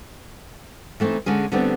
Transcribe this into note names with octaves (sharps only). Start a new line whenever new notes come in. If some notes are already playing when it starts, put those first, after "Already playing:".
E3 A3 B3 C4 D#4
D3 G#3 C#4 G#4
D3 G3 A3 B3 C4 D4